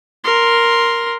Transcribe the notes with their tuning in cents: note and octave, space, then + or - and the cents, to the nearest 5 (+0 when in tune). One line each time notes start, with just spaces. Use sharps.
A#4 +0 C6 +0